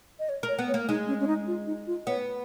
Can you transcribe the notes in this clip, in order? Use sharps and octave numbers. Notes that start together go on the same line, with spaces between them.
D#5
C#5
A#4
C#5
B3
C#5
A#3
G#3 D#4
C#4
C#4
D#4
F4
D#4
F4
B3 C#5